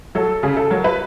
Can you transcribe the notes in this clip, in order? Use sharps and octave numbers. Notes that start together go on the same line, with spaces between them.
F#3 A4
C#3 G#4
A4
F#3 A#4
B4